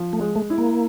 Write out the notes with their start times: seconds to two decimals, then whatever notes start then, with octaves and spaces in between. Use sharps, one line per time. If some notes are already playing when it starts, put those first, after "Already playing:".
Already playing: F3
0.13 A3
0.21 G#3
0.35 A3
0.50 E4
0.58 A#3